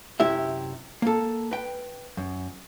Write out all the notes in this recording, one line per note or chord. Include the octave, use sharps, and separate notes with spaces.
F#2 C3 E4 G4 E5
A#3 A4
B4 G5
F#2